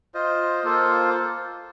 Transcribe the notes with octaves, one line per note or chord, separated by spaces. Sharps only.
F4 C5 D#5
A#3 F4 A4 C5